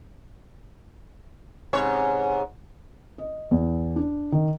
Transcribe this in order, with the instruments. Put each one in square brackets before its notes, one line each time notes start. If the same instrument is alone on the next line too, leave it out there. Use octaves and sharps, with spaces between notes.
[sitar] G#2 C3 C#5
[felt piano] D#5
E2
D4
D#3